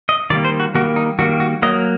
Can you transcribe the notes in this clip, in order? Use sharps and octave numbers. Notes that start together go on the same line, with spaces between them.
D#5
D#3 G3 A#3 D5
C5
F#4
D#3 G3 A#3 F#4
D#4
D#3 G3 A#3 F#4
F#4
F#3 A#3 D#5